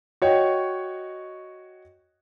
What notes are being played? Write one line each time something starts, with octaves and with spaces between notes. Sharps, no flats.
F#4 C#5 D#5 G5